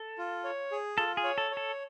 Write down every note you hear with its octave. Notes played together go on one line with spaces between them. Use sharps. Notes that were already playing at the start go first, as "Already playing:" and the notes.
Already playing: A4
F4
C#5
G#4
F4 A4
G#4
C#5
A4
C#5
A4